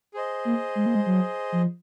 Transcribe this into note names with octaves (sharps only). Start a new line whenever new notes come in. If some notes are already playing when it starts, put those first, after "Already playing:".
G#4 C5 D#5
A#3
G#3
A#3
G#3
F#3
F3